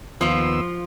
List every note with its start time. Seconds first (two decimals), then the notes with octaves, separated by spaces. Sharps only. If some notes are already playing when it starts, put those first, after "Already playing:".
0.21 D#2 F3 B3 F4 E6